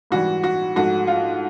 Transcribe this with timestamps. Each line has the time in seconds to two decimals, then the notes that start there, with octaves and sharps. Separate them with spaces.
0.11 G#2 E3 G3 F#4
0.43 F#4
0.76 G#2 F3 A3 F#4
1.07 F4